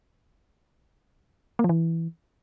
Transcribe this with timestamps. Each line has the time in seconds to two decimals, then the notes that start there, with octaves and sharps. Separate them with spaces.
1.59 A#3
1.64 F3
1.69 E3